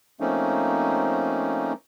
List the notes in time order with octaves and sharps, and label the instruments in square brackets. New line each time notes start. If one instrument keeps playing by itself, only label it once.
[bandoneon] F3 A3 A#3 C4 C#4 D#4